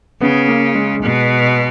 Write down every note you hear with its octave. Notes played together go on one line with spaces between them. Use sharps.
C#3 B3
A#3
G#3
B2